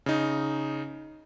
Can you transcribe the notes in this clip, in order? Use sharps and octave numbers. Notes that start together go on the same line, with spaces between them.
C#3 D#4